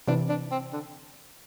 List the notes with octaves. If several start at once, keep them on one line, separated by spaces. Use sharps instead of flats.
C3 E3 D4
D4
C4
D3